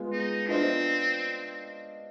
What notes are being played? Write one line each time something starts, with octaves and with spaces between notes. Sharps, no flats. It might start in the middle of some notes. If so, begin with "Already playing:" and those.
Already playing: G#3 B3 F4
D#4
B3 C4 D4 F4 C5 D#5